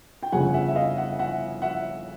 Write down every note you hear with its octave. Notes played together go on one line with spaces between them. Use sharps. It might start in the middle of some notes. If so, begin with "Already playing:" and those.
G5
G1 F2 C#3 F3 F#5 G#5
E5 F#5
E5
D#5 F5
E5 F#5
E5 F#5
E5 F#5